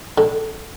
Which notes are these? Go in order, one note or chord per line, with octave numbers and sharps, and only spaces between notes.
D3